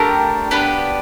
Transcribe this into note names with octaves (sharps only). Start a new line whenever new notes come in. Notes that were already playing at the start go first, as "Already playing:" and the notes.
Already playing: A3 D4 G4 A#4
B3 D4 G4 B4